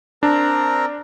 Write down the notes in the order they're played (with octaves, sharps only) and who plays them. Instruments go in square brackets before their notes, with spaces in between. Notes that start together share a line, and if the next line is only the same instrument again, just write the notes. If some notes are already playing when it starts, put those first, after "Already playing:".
[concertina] C4 A#4 A#5 [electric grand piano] D4